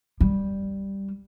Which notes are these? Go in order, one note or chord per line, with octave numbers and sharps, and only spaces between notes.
G3